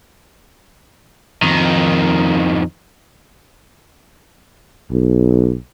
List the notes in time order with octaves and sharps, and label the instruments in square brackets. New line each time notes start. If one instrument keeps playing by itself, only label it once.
[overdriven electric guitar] F2 D#3
[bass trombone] B1